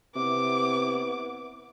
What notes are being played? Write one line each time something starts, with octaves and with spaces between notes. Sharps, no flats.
C3 B3 E4 D6